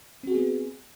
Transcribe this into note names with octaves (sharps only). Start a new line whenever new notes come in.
B3 C4 F#4 G#4